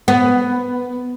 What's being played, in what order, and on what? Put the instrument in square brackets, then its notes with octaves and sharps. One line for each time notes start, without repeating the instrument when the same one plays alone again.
[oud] B3